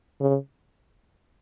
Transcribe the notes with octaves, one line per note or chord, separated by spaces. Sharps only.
C#3